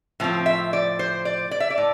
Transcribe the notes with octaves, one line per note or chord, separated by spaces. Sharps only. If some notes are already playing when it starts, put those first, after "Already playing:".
A2 F3 C4
E5
D5
C5
D5
D5
E5
D5
A2